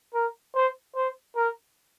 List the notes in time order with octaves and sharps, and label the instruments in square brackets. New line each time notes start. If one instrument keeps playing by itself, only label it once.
[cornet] A#4
C5
C5
A#4